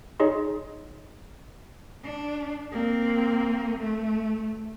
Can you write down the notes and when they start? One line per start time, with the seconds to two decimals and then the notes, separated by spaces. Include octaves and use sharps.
0.20 D#4 G#4 C#5 D#5 C6
2.04 D4
2.72 A#3 C4
3.78 A3